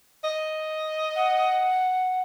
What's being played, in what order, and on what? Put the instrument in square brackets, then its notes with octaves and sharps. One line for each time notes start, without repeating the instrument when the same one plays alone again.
[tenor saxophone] D#5
[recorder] F#5